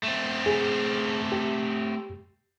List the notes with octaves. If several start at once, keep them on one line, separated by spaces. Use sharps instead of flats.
A3 C4
G#4
G4